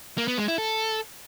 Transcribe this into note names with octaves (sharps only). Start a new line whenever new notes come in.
A#3
B3
G#3
E4
A4